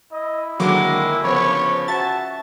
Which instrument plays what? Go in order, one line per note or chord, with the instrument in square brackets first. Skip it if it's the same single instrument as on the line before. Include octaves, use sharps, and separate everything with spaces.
[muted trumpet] E4 [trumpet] D#5
[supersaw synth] D3 F#3 D6 [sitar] D#3 G#3 A#3 [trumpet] F#4
[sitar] C#3 F3 B3 [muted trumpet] C#5 [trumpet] B5
[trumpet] F#4 [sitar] E5 [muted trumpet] A5 [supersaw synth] A6